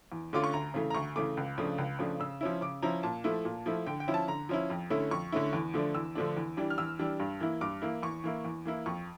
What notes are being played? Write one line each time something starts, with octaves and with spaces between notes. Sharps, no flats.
E2
D3 A3 C#4 F4 D6
C#6
D2 A#5
C#3 E3 A3
A#5
D2 C#6
C#3 E3 A3 D6
C#2
C#3 F3 A3 D4
C#2
C#3 F3 A3 D4
C#3 E6
F3 C#4 E4
C#3 D6
F3 C#4 E4 A#5
A#2 A5
F3 A3 E4
A#2
F3 A3 E4
D3 G5
G5
F3 C#4 E4
A5
D3 A#5
F3 C#4 E4
F2
D3 A3 C#4 E4
F2 C#6
D3 A3 C#4 E4
E2
D3 F3 A3 D4
E2 E6
D3 F3 A3 D4
E2
E3 G3 D4
F6
E2 E6
E3 G3 D4
G2
E3 A#3 E4
G2 D6
E3 A#3 E4
E2 C#6
E3 A#3 E4
E2
E3 A#3 E4
F2 C#6